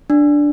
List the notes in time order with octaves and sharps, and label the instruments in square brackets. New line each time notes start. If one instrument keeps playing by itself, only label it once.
[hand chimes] D4